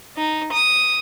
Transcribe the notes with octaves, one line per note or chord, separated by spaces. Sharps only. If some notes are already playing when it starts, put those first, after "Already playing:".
D#4
D#6